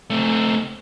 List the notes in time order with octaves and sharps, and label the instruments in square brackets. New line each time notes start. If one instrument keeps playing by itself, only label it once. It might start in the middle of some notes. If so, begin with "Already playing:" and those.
[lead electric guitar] A3 C4